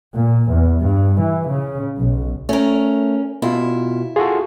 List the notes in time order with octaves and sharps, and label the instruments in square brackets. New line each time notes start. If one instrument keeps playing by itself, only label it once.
[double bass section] A#2
E2
G2
E3
C#3
B1
[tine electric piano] A3 [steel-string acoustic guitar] C#4 A#4
[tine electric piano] B2 F4 [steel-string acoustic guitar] E4
[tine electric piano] F4 F#4 A4 [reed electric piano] G#4